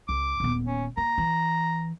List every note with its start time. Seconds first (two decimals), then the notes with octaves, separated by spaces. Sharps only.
0.09 C#2 D6
0.40 D#1 B3
0.66 C#4
0.97 A#3 A#5
1.18 E3